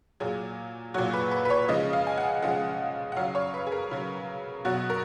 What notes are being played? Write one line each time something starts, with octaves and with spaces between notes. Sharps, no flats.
A#2 F#3 G#4
A#2 F#3 F#4
B4
B4
B4
C#5
C#3 F3 G#3 D#5
F5
G#5
F#5
C#3 F3 G#3 F#5
F#5
C#3 F#3 F5
C#5
B4
G#4
A#4
C#3 F#3
B2 F#3 F#4
A#4